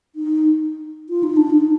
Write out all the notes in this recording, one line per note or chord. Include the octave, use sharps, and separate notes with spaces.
D#4
F4
D#4
D4
D#4